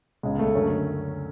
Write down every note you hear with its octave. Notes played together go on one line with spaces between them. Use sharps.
C#2 C#3 G#3
A3
F#2 D3 C#4